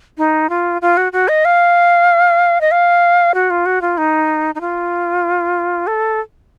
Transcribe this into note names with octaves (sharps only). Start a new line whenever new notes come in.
D#4
F4
F4
F#4
F#4
D#5
F5
D#5
F5
F#4
F4
F#4
F4
D#4
D#4
F4
A4